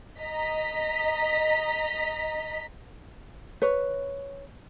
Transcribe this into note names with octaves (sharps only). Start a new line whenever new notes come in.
D#5 A#5 B6
B4 C#5